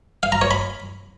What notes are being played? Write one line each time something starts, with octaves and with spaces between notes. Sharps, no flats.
F5
A#5
C#5
B5